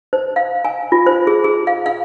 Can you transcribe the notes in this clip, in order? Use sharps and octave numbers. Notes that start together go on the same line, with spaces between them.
C5
F5
G#5
F4
C5
G#4
G#4
F5
F5